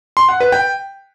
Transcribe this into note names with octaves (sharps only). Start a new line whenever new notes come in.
C6
F#5
B4
G5